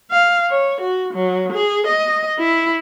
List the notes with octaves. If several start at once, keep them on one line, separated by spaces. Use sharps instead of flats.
F5
C#5
F#4
F#3
G#4
D#5
E4